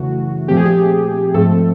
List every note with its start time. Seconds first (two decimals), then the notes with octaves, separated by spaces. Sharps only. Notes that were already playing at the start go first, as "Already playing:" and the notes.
Already playing: F#2 C#3 E3 A3 F#4
0.48 A#2 F3 A3 C4 G4
0.57 G#4
0.65 G4
1.34 G#2 F3 A3 C4 A4